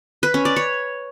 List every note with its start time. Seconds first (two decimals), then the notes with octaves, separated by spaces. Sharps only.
0.23 B4
0.34 C#4
0.45 D5
0.56 C#5